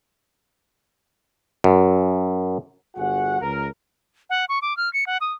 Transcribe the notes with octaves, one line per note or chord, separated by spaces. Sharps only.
F#2
G1 G3 F#4 G#4 F#5
C#2 A#4
F#5
C#6
D6
F6
C#7
F#5
D#6